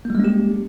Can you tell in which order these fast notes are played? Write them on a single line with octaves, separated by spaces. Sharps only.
A#3 G3 G#3 C#4 G4